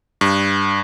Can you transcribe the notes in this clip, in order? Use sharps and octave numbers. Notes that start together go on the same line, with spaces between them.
G2